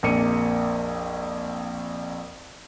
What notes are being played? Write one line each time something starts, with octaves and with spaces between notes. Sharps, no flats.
A#1 F2 A#3 C#7 D#7